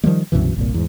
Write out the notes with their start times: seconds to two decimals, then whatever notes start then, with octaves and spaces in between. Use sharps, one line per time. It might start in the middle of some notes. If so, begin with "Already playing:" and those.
0.04 D#3 F3 G3 G#3
0.32 C2 F#2 B2 E3
0.56 G1 C2 A#2
0.74 E2 G#2